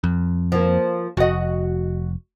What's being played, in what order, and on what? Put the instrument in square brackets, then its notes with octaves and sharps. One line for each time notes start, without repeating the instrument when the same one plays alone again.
[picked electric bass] F2
[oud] F3 A#3
[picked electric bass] F1 [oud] F#4 D#5